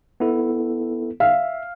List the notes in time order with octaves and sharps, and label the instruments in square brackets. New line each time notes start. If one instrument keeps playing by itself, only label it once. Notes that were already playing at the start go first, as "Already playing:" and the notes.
[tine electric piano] B3 E4 A4
[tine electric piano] E5 [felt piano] F5